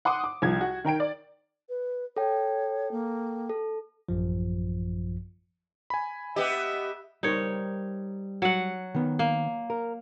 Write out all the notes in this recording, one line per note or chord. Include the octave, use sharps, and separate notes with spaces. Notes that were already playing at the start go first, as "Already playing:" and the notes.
F#5 C6 D6 D#6
D6
C2 F3 G#6
F#4
D#3 A#4 G5 D7
D5
B4
A4 C#5 G5
A#3
A4
A1 F#2 F3
G#5 B5
B3 G4 D#5 E5
G3 D#4 A#4 C5 C#5
F#3 F#5
D#3 B3
A#3
A#4